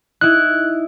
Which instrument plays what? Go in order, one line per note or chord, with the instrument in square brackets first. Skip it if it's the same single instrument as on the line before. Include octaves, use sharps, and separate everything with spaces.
[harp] D#4 E4 [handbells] F#6